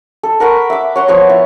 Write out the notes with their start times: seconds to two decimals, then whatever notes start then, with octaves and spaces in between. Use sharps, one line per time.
0.23 A4
0.40 A#4 F#5 B5 C#6
0.70 E5 D6
0.96 C#5 F#5 C6
1.08 F3 B3 F5 C#6
1.30 E4